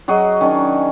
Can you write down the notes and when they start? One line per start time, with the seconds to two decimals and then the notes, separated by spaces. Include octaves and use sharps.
0.08 F#3 F#4 G#4 D#5
0.41 D#3 C#4 D4